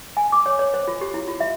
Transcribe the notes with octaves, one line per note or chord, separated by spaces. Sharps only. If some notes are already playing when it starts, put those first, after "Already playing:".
G#5
D6
C#5
C#5
C5
F4
G4
E4
F4
E5